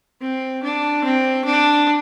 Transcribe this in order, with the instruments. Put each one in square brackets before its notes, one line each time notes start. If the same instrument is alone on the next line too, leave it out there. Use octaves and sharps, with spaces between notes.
[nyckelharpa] C4
D4
C4
D4